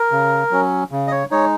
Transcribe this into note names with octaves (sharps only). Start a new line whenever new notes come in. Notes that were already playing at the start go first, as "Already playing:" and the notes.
Already playing: A#4
C#3
F#3 C#4
C#3
D#5
C#5
G#3 D#4 C#5